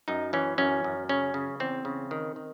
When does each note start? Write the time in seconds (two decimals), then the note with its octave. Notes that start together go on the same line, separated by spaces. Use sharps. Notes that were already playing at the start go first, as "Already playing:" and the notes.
0.08 F#2 D#4
0.33 E3 C#4
0.58 F#2 C#4
0.84 F#2
1.09 C#3 C#4
1.34 C#3
1.60 E2 C4
1.85 C#3
2.11 D#3
2.36 D#3